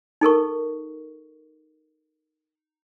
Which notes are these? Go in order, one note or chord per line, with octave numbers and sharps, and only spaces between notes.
D#4 A4 A#4 C#6